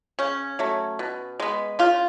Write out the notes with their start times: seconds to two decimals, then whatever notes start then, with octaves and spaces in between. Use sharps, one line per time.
0.19 C#3 C#4
0.59 F#3 A3
0.99 B2
1.40 G#3 B3
1.79 C#3 F4